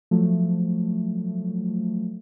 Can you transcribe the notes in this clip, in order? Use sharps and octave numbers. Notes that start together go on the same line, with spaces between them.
F3 F#3 A3